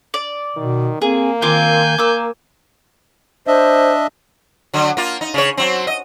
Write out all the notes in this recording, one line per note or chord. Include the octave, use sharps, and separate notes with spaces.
D5
B2 D#3
A#3 C4 G#4
D#3 C4 F4 G#5 D6 G6
A#3 A#4 D6 E6
D4 C5 D#5 E5
D3 F#3
A#3 F4
D#4
C#3 C#5
F#3 C4
D#5